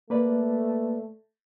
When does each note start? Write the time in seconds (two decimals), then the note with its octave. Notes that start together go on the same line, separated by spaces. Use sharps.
0.10 A3 A#3 B4 D5